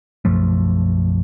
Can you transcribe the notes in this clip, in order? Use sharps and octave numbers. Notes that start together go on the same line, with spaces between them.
B1 F#2 F3 A3